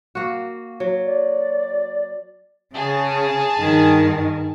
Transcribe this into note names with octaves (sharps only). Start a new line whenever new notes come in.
A#3 F#4
F#3
D5
C#3 G#4 A5
G2 D#3